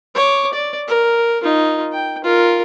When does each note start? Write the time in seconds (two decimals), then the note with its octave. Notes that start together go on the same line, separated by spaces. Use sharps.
0.15 C#5 D6
0.53 D5
0.88 A#4
1.43 D#4 F4
1.92 G5
2.24 F4 A#4